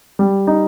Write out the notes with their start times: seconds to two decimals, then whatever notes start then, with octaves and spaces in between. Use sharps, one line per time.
0.19 G3
0.47 D#4